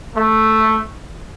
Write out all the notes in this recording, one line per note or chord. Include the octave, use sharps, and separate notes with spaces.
A3